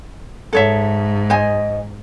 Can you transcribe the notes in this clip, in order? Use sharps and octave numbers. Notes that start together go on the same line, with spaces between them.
G#2 A4 C#5 E5
C5 D#5 G#5